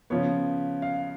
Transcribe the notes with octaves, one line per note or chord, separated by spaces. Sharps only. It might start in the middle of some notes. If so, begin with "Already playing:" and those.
C#3 F3 B3 C#5
F5